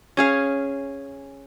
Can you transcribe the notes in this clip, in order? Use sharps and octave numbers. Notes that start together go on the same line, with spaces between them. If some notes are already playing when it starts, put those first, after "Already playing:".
C#4 G#4 F5